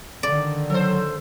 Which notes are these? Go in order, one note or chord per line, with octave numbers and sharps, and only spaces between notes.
D3 D#3 D5
F#3 A4 C5